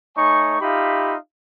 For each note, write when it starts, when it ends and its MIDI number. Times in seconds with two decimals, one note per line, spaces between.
0.16 0.57 57
0.16 0.57 63
0.16 0.57 73
0.16 0.57 80
0.16 0.57 85
0.61 1.15 63
0.61 1.15 65
0.61 1.15 67
0.61 1.15 76
0.61 1.15 77
0.61 1.15 83